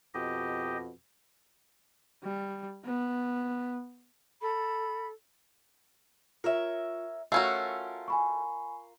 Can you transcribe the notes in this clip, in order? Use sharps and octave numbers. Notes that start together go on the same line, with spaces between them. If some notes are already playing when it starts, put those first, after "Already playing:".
F2 B2 G4 D#5
G3
B3
A4 B5
F4 A#4 C#5 E5
A3 C#4 F4 F#4 A#4 E6
G#5 B5 C#6